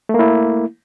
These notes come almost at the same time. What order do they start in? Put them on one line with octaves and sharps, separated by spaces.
A3 A#3 E4